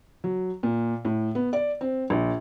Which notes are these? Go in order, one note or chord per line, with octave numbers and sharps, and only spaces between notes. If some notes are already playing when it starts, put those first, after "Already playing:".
F#3
A#2
A2
B3
D5
C4
A#1